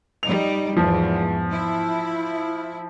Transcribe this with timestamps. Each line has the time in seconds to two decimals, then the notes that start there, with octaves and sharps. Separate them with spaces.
0.23 G3 D#4 F7
0.77 E2 G#2 F3
1.50 E4